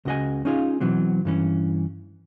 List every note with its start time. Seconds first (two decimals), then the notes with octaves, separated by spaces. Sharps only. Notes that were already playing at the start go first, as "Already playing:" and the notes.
0.05 C#2 C#3 F#4 D#5 F#5 G#5
0.45 C#4 D#4 F4 G#4 C#5 F5
0.80 B2 E3 F#3 C4
1.25 G2 E3 C#4